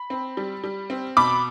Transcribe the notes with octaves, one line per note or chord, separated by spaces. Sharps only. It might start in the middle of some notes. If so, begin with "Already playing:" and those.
Already playing: B5
C4
G3
G3
C4
B2 B5 D6